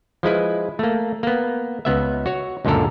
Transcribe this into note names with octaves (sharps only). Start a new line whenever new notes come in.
F3 G#3 E4 B4
A3 A#3
A#3 B3
C#2 B3 E5
F#4 C#5
C#2 F#2 A#2 D3 A4 A#4